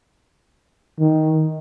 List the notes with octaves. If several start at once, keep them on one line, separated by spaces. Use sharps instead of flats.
D#3